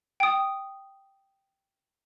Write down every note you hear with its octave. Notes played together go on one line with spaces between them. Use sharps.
G5 D#6